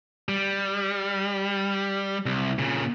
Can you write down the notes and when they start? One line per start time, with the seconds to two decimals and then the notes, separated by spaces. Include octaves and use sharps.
0.29 G3
2.26 C2
2.59 A#2 C#3